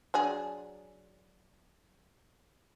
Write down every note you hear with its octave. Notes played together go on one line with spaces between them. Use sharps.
F#3 D4 G#4